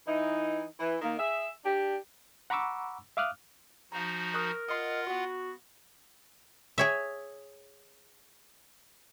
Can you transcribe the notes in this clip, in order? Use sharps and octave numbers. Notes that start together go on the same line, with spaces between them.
E3 D#4
E3
D#3 A#3
G#4 E5
D4 G4
F#5 A#5 B5 C#6 D6 E6
E5 F5 D6 D#6 F6 F#6
F3 D#4 F#4 F5 A#5
A#4 C#6 D#6 F#6
F4 D#5 F5 F#5 C6
B3 F#4 C#6
G#4 C#5 E5